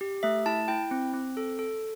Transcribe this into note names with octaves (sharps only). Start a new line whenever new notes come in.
G4
A3 E5
E4 A5
E4 G5
C4
C4
A4
A4